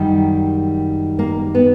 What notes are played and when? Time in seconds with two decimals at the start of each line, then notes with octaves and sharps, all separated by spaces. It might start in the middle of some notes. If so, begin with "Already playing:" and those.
Already playing: F#2 D#3 G3
1.19 A#3
1.55 B3